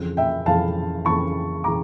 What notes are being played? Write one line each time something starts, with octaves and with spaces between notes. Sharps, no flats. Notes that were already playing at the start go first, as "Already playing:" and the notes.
Already playing: F2 C#3 E3
E5 G5
F2 C#3 E3 F5 A5
F2 C#3 E3 A5 C#6
C#3 E3 A#5 D6